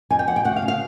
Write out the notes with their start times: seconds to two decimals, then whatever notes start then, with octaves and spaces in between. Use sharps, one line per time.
0.10 F2 G#5
0.19 G5
0.27 F2 F#5
0.36 G5
0.45 D2 F#5
0.56 F5
0.62 C#3
0.68 F5